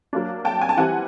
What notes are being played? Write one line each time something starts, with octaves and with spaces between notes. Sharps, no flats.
F#3 A#3 D4
G5 A5
G#5
A5
E3 G3 C4 E4 F#5 G#5